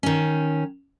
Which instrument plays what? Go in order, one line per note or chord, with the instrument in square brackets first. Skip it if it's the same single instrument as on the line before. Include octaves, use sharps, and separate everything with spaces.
[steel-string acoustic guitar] D#3 C#4